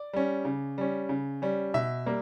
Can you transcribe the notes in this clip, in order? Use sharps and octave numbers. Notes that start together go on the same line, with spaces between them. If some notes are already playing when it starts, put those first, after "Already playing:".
Already playing: D5
G3 C#4
C#3
G3 C#4
C#3
G3 C#4
B2 E5
G3 A#3